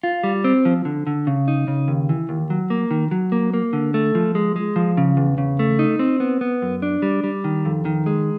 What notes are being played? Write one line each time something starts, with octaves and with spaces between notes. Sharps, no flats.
F4
G3
C4
F3
D3
D3
C#3
D#4
C#3
D#2
E3
D#2
F#3
A#3
D#3
F#3
A#3
A#3
D3
A3
F3
G#3
G#3
F3
C#3
E2
C#3
A3
D#4
C4
B3
B3
F#2
D4
G3
G3
D#3
F2
D#3
G#3